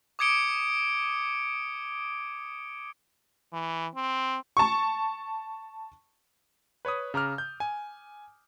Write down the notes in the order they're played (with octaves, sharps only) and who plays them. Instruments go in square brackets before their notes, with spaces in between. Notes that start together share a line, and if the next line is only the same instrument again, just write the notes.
[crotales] D6 D#6 G#6 C#7 D7 G7
[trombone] E3
C4
[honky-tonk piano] A5 C#6
[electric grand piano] B4 C#5 B5 D#6
C#3 A#5 D6 F6
G6
G#5